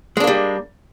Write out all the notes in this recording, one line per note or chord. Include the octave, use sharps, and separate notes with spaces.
G3 G#3 A#3 D4